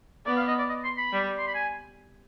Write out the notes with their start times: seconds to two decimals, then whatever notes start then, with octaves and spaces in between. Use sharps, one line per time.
0.26 B3 D5
0.37 F5
0.48 D#5
0.58 D5
0.69 D#5
0.84 C6
0.98 B5
1.13 G3
1.39 C6
1.47 B5
1.55 G#5